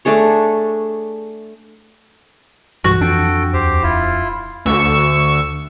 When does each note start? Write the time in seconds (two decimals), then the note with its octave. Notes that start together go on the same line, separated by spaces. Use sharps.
0.05 A3 D4 G#4 C#5
2.84 B1 G2 E3 F#4
3.01 F2 D4 A4 G5
3.53 D#2 G4 C5
3.83 D#1 E4 F4
4.66 D2 C#6 E6